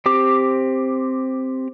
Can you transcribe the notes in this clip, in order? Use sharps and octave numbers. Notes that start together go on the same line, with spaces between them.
C4 G4 D6